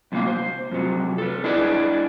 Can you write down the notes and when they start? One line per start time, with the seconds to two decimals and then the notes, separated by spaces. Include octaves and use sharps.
0.12 F2 A2 C3 F#3 A#3 F5
0.27 C5
0.71 F2 C3 F#3
1.18 A4 B4
1.44 D4 E4 G#4 B4 C#5 D5